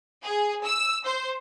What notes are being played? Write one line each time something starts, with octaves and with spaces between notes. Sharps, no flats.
G#4
E6
C5